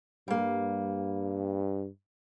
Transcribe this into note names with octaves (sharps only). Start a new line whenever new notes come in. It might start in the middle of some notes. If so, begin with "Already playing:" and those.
G2 G3 A#3